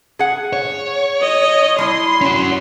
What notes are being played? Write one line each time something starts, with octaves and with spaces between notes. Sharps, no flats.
G#4 F#5
C#5
D#5
G3 E4 C6
C#4 F#4